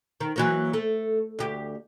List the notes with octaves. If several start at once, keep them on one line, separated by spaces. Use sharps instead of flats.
D#3
E3 F#3 A#3
A3
D2 G4